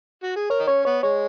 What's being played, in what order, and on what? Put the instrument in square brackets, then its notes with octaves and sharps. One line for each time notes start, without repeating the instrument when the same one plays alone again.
[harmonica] F#4
G#4
[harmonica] A#4 [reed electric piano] C#5
[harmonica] D#4
[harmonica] C#4 [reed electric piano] C#5
[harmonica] B3 [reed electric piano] C#5
[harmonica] G#3 [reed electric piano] C#5